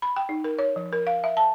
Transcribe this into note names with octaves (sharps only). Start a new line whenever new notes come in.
B5
G5
D#4
A#4
C#5
F3
A#4
F5
E5
A5